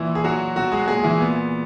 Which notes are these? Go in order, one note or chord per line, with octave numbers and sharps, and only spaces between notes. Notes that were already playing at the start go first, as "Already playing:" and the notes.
Already playing: A#2 E3 E4
G#4
A#2 F#3 F#4
B2 F#3 F#4
G#3 G#4
A#2 G#3 G#4
E3 E4
A#2 B3